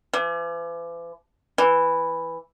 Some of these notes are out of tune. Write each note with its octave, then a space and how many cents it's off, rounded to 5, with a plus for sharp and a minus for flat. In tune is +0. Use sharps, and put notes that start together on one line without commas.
E3 +45
E3 +0